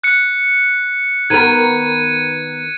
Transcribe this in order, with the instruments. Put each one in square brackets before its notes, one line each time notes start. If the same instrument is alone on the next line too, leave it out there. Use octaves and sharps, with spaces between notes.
[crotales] F#6 C#7
[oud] D#3 B3 A#4 [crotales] G#6 D#7